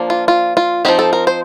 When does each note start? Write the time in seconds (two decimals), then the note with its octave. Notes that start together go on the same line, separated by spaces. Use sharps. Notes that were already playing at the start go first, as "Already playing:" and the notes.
Already playing: F3 A#3 D4
0.10 F4
0.28 F4
0.57 F4
0.85 F3 C4 D#4 G4
0.99 A4
1.13 A#4
1.27 C5